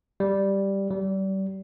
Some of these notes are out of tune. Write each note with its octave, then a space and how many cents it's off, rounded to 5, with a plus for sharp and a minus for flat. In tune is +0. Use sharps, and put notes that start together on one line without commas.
G3 +0
G3 -30